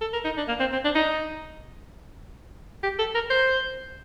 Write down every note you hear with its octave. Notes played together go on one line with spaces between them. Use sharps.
A4
A#4
D#4
D4
A#3
C4
C4
D4
D#4
G4
A4
A#4
C5